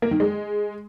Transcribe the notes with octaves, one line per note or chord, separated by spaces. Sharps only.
A#3
D#3
G#3